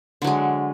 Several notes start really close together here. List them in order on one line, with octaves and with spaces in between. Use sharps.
D3 F#3 G#3